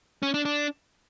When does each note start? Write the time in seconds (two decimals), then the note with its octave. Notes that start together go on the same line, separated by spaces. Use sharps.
0.23 C#4
0.34 D4
0.45 D4